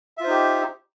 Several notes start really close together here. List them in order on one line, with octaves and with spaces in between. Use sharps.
E5 F4 C5 D#4 G4